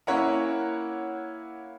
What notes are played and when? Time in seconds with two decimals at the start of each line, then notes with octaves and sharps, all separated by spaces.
0.07 A#3 C#4 E4 C#5 F#5 A#5